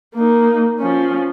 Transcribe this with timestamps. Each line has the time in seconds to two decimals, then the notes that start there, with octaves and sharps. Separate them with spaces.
0.15 A#3 D#4
0.79 F3 C#4